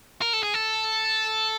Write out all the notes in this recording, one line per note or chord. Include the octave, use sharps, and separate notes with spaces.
A#4
A4
G#4
A4